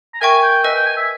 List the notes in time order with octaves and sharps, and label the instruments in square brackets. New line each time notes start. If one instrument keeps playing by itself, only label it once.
[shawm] A#5
[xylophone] A#4 E5 G5 C#6 [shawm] G#5
[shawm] G5
[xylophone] B4 D#5 G#5 [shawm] E5
[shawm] G5
G#5
E5